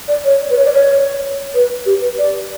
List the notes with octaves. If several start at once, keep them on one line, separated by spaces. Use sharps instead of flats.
D5
C#5
B4
C#5
D5
C#5
B4
G4
B4
D5